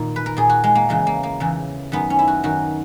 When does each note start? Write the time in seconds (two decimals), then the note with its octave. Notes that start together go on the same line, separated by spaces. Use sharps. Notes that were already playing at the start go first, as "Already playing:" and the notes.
Already playing: A#2 D#3
0.16 B4
0.26 A#4
0.37 A#2 G#4
0.49 F#4
0.64 G#3
0.75 A#3
0.89 E2 C#3 E3 G#3
1.07 A#3
1.23 A#3
1.40 E2 C#3 E3
1.92 F#2 D#3 B3
2.10 C#4
2.19 E4
2.28 F#4
2.44 F#2 D#3 F#4